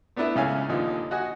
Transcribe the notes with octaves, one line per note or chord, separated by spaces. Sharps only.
A3 B3 D4 E4 B4 E5
C#2 C#3 C#4 E5 F5 G#5
D#2 A#2 D3 F3 D#4
F#4 D#5 F#5 G#5